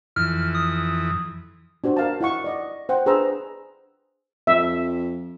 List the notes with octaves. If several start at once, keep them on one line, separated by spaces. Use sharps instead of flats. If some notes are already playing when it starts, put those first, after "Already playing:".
F2 E3 F6
D#6
D4 F#4 C5
A#4 F5 A5
E4 D#5 F#5 C#6
D5 D#5 F#5
C5 F#5 G5
D4 G#4 B4 C5 A#5 E6
F2 E5